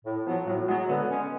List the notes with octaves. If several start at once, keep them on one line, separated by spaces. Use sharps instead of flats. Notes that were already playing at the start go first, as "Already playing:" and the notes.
A2
F3 F#3 B3
A2 F#3
F#3 G#3 B3
D3 B3
G#3 C#4